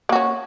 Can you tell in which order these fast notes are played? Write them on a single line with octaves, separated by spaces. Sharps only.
A#3 F#4 C#4